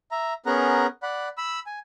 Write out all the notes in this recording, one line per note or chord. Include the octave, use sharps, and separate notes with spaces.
E5 A#5
B3 C#4 G#4 A#4 F#5 A#5
D5 F#5 B5
B5 E6
G#5